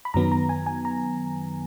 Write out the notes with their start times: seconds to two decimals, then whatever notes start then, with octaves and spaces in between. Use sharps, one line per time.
0.05 B5
0.14 F#2 D#3 F#3 B3 A#5
0.32 A#5
0.49 G#5
0.66 G#5
0.85 A#5